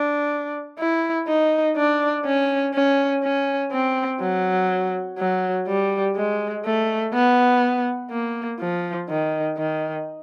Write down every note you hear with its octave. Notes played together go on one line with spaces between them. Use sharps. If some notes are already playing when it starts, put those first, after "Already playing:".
Already playing: D4
E4
D#4
D4
C#4
C#4
C#4
C4
F#3
F#3
G3
G#3
A3
B3
A#3
F3
D#3
D#3